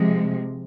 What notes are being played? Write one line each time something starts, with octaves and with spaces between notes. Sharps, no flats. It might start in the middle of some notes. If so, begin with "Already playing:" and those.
Already playing: C3 F3 G#3